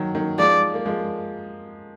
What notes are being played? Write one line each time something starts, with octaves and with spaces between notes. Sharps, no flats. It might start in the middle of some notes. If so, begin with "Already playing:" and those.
Already playing: D#3 F#3
D#3 F#3
F3 G#3 D5
A#3
F3 G#3